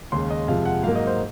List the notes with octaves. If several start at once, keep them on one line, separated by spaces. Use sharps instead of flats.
D#2 C#3 G#3 C6
D#5
F2 C3 F3 G#3 F5
F#5
G#2 F#3 A#3 F5
D#5
C5